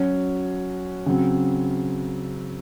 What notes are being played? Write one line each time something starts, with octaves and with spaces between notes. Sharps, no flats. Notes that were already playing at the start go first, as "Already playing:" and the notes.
Already playing: F#3 C#4 F#4 C#5
C#3 F#3 C4